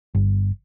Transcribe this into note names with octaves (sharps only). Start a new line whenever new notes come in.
G1